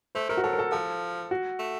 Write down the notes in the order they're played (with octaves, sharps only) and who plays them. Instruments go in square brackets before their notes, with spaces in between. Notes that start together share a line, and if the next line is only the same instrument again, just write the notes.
[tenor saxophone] A3 [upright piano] C5
[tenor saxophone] A3 [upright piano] A#4
[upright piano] F#4
[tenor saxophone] F#3 [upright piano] A4
[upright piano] A#4
A4
[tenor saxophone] F3 [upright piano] A4
[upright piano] F#4
[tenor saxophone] A3